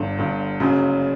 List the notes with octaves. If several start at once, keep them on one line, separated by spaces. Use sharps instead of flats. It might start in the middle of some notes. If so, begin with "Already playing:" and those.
Already playing: G1 G2 D3
G1 G2 D3
F#1 F#2 C#3